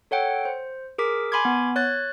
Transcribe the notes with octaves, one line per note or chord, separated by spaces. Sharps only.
A4 C#5 F#5 G5
C5
G#4 A#4 D6 B6
G#5 B5 C6 D6 G#6
B3
C#5 F#6 A6